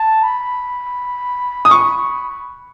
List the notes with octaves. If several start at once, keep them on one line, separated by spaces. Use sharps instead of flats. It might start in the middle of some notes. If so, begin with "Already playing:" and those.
Already playing: A5
B5
D#6
C#6